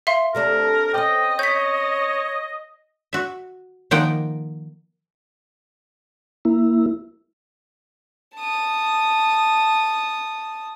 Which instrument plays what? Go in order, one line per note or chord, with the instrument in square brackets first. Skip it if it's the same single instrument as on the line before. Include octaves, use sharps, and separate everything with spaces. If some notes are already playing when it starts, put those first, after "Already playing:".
[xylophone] E5 F5 C6
[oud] C3 A3 D4 [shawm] A#4
[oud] C4 C#4 [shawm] D#5 [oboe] G5
[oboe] C#5 [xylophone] G6 B6
[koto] F#4 E5
D#3 F3 A#3 D#4 F#5 G5
[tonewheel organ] A#3 E4
[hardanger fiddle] A5 D#6